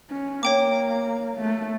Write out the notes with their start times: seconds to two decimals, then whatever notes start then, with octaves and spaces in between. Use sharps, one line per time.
0.11 C#4
0.43 A#3 C#5 G5 D6
1.37 A3